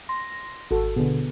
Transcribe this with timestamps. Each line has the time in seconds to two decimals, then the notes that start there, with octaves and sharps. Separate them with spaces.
0.09 C6 A#6
0.71 G#1 F#4 A4
0.96 B2 D3 B3 G#4